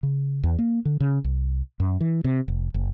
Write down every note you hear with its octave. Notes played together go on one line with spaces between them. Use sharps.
C#3
E2
A#3
D3
C#3
C2
F#2
E3
C3
F1
F#1